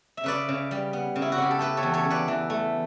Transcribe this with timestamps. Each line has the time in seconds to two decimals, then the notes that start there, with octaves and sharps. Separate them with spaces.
0.17 E5
0.24 C#3 B4 D5
0.49 C#3
0.71 G3
0.93 B3
1.16 C#3
1.22 E4
1.32 F#4
1.38 C#3 G4
1.51 A4
1.59 A3 G4 B4
1.77 A4 C#5
1.83 E2
1.94 A4 C#5
2.05 C#3
2.10 B4 D5
2.28 E3
2.50 A3